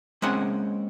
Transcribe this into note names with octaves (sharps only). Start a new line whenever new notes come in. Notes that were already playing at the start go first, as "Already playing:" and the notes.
G#3 A#3 C4 C#4 F#5